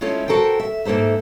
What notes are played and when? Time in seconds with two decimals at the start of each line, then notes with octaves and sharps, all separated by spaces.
0.01 G#3 A3 C#4 E4 F4 A4
0.28 F#4 A4 A#4 C5 G5
0.60 E5
0.85 G#2 A#3 A4 C5 E5